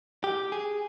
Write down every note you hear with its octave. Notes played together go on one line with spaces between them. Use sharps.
G4
G#4